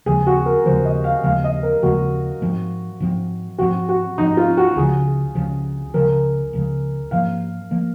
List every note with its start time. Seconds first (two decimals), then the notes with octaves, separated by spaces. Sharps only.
0.06 D#2 C#3 F3 G#3 G#4
0.27 F#4
0.46 A#4
0.66 D#2 C#3 F3 G#3 C5
0.85 D#5
1.04 F5
1.24 D#2 C#3 F3 G#3 F5
1.44 D#5
1.63 A#4
1.82 D#2 C#3 F3 G#3 F#4
2.42 G#2 F3 C4
3.00 G#2 F3 C4
3.58 G#2 F3 C4 F#4
3.89 F#4
4.18 G#2 F3 C4 D#4
4.37 F4
4.57 F#4
4.76 C#2 C#3 F3 G#4
5.35 C#2 C#3 F3
5.94 C#2 C#3 F3 A#4
6.53 C#2 C#3 F3
7.11 G#2 F3 A#3 F5
7.71 F3 A#3